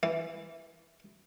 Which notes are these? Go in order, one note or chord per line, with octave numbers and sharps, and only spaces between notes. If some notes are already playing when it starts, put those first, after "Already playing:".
E3